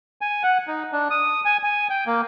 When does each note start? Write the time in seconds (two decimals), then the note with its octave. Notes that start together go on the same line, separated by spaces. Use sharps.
0.21 G#5
0.43 F#5
0.67 D#4
0.92 D4
1.10 D#6
1.45 G#5
1.63 G#5
1.90 G5
2.06 A#3